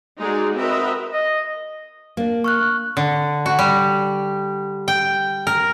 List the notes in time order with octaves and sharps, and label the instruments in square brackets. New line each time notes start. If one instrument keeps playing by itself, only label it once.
[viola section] G#3 D#4 F#4 G#4 D5
C4 F#4 A#4 B4 D#5 E5
[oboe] D#5
[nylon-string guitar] A#3 D4
[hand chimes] C#6 F6 F#6
[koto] D3
F#4
G3
G5
A#4